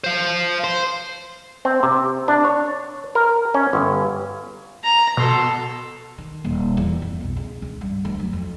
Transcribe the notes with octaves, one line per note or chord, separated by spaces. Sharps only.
C5 F5
C5
C4
C3
D4
C#5
A#4
C#4
G1
A#5
B2 A4 C6
D#3
D#1
E2
F2
B1
C#3
C#2
G2
D2
F#3
F2